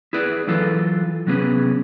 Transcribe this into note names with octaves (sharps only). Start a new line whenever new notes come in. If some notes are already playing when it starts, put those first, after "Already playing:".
E4 G#4 B4 D5
E3 F#3 E4 F4 A4 B4
C3 F#3 B3 C#4 G#4 B4